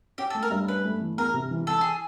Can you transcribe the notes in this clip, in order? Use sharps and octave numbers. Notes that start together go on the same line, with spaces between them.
C#4 G4
A4
A3
A#4
G2
C#4 B4
A3
E3
E2 A#4
C3
E3
E3 A4
G#4